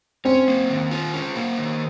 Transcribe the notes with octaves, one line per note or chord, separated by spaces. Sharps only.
C4 C#4
A#3
D#3
F4
C#4
A#3
D#3